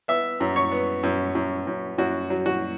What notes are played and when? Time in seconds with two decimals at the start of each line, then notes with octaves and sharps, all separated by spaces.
0.08 B3 E5
0.40 F#2
0.56 C#5
0.72 B3
1.03 F#2
1.35 F#2
1.67 F#2
1.98 F#2 F#4
2.30 F#3
2.46 F#4